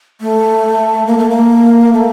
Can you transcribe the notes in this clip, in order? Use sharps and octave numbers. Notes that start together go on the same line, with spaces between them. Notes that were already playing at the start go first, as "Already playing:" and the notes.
A3
A#3
A3
A#3
A3